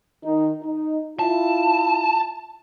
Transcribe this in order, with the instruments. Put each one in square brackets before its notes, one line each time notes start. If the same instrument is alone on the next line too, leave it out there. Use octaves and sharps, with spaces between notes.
[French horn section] D#3 D#4
D#4
[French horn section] E4 F4 [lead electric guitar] A5